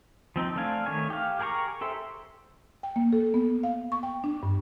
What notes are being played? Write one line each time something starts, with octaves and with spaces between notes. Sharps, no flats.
F3 C4 D#4
A3 C4 D4 F5 G#5
D#3 A3 C#5 G#5
G4 F5
G4 G#4 A#4 A#5 C#6
G4 A4 C5 E5
G5
A#3
A4
B3
F5
C#6
G5
D4
G2